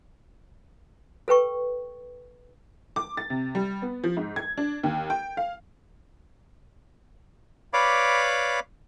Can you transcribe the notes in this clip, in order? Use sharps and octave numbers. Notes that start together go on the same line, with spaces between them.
A4 B4 G5 C#6
D6
A6
C3
G3
B3
F3
G#2
G#6
D4
D#2
G5
F5
B4 C#5 D5 F5 B5 D6